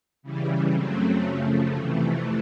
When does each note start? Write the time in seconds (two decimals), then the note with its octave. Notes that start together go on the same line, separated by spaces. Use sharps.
0.23 C#3 E3 G3
0.73 F#2 C#3 F#3 A3 C4
1.23 F#2 C#3 F3 A3
1.73 F2 C3 E3 A3